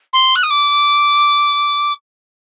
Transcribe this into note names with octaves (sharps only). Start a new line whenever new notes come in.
C6
F#6
D#6
D6